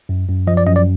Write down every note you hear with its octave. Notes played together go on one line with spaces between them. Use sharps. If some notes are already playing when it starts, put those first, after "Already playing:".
F#2
F#2
F3 D#5
D5
F#2 D#5
D5